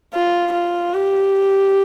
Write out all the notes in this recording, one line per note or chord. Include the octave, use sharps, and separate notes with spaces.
F4
F4
G4